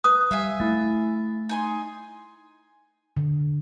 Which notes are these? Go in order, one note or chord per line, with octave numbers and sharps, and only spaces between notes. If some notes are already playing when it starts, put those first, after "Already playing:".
B4 D#6
G3 E5 F5 G#5
A3 E4 A6
D#4 G#5 C6
D3